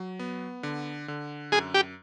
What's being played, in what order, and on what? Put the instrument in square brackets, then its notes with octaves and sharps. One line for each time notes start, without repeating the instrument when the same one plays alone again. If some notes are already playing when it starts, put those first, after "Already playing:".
Already playing: [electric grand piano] F#3
B3
D3
D3
[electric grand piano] F#2 [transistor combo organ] G#4
[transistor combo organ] G4